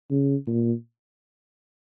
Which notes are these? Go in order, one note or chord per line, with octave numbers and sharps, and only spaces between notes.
C#3
A#2